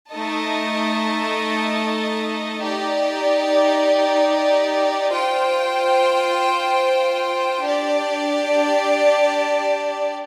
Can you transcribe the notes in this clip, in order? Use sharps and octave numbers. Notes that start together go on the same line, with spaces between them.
A3 D#4 A4 D#5 A5
D#4 G4 D5
F4 C5 G5
D4 G4 D5